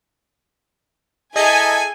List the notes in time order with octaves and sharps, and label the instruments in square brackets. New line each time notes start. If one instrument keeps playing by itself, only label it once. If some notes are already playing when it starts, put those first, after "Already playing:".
[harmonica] E4 G#4 A4 [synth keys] D#5 A#5 [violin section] G#5